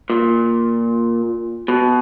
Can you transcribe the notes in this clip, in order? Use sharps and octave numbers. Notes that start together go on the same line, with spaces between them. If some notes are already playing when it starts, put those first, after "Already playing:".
A#2
B2